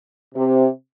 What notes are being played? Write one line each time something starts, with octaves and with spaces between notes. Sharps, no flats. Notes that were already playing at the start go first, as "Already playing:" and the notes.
C3